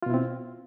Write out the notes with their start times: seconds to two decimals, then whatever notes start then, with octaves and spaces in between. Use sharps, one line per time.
0.02 F4
0.06 B2
0.10 E4
0.14 C4